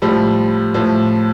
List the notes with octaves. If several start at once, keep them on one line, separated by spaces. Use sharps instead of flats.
A2 F3 G3
A2 F3